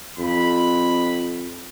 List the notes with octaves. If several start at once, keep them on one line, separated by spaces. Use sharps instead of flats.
F2 B5